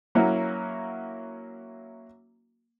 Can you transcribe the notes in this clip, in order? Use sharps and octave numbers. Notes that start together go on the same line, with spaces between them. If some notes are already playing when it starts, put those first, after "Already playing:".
F#3 A#3 C#4 E4 F#4